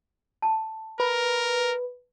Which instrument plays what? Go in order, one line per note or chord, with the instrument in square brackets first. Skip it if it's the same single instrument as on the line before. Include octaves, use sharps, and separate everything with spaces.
[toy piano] A5
[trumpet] A#4 [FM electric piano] B4